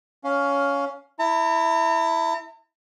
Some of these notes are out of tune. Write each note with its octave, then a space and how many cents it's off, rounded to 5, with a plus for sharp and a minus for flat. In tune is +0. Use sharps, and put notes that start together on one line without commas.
C#4 +15 F5 +5
E4 +0 A#5 -45